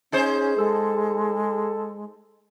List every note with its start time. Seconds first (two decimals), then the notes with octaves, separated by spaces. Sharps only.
0.12 C#4 D#4 G#4 C5
0.58 G#3 A4